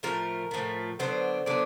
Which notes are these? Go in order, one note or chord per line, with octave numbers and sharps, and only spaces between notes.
A2 F3 A3 A#4
A2 F3 A3
D3 F#3 B3 D4 C5
D3 F#3 B3 D4